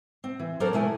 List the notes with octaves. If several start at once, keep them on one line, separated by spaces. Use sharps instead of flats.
C4
E3
F#3 C4 D4 A4 A#4 C5
B2 G#3 A3 E4 G#5